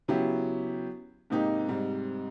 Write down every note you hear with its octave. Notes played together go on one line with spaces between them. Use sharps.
C#3 F#3 B3 E4 G4
G#2 C3 A#3 D#4 G4
G#2 C3 G3